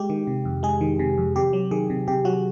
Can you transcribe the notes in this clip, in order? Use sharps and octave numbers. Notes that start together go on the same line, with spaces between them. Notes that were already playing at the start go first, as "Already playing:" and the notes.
Already playing: G#3 G4
D#3
C3
F2
G#3 G#4
D#3
C3
F2
C3 G4
F#3
D#3 G#4
C3
C3 G4
F#3 F#4